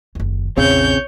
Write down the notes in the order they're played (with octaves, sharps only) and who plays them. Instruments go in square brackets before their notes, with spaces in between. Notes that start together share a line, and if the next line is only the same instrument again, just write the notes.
[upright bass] F#1 D#2
[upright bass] A#1 E2 [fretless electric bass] C#3 [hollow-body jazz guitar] C4 [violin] C#5 G6